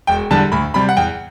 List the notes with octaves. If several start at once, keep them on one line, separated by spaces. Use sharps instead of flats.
E1 G5
E2 D3 G3 A5
D2 B5
C3 G3 B5
F#5
E2 G5